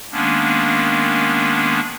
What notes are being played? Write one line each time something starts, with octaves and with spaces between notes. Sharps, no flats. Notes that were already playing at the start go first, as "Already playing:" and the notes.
D#3 G#3 A#3 B3 C#4 D4